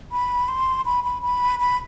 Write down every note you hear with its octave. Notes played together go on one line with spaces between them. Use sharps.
B5
C6
B5
B5
B5
B5